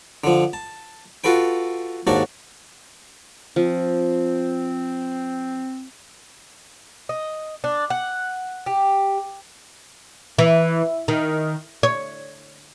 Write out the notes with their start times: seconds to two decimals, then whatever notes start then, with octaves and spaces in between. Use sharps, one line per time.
0.24 D3 F3
0.53 A5
1.24 F4 F#4 A4 B4 G5
2.07 D#2 G#2 D4 F#4 A5
3.56 F3 C4
7.09 D#5
7.64 D4
7.90 F#5
8.66 G4
10.39 E3
11.08 D#3
11.83 C#5